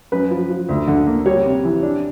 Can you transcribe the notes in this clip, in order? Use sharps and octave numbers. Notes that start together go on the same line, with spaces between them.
F#2 B4
F3
F3
D2
D3
A#3
G3 C#5
C3
E3
D4